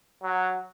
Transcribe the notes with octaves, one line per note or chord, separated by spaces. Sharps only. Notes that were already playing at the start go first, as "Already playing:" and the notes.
F#3